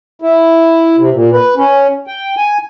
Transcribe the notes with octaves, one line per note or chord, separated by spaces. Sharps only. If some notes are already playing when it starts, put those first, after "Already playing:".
E4
C3
A#2
B4
C#4
G5
G#5